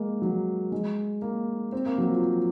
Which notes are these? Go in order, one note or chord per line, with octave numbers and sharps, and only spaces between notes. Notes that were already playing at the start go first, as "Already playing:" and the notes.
Already playing: G#3 A#3
F#3
G#3
A#3
C4
A#3
F#3
F3
F3